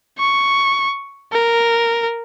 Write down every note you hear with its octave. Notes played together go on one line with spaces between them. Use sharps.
C#6
A#4